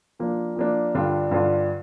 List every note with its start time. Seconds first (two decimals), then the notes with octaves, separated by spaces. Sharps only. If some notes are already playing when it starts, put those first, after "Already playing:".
0.19 F3 A#3 D4
0.56 F3 A#3 D4
0.94 G2 D3 G3 D4 F4
1.31 G2 D3 G3 D4 F4